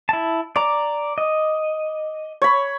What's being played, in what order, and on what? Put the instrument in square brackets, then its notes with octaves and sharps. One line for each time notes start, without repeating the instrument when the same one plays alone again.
[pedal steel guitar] E4 A5
[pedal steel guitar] D5 A#5 [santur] D6
[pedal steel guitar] D#5
[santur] C#5 B5